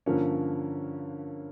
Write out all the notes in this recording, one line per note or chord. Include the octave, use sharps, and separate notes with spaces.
G2 D3 F3 A#3 C#4